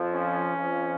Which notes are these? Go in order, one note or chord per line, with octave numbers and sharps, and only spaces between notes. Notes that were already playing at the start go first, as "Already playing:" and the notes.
Already playing: F2 F3
C#4
F2 F3